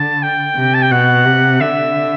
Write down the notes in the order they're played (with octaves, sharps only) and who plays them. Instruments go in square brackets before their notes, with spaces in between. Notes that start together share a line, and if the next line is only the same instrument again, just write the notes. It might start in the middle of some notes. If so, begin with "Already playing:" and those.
Already playing: [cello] D3 [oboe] A5
[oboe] G5
[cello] C3
[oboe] A5
G5
[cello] B2 [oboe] F#5
[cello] C3
[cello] D3 [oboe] E5